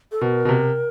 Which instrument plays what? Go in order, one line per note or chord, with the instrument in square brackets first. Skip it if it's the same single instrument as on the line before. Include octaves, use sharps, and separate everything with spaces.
[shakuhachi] A4
[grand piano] B2 [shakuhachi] A#4
[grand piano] B2
C3